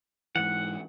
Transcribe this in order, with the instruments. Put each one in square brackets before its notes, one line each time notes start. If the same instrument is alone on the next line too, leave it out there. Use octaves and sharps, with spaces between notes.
[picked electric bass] G#2 E3 [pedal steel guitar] F#5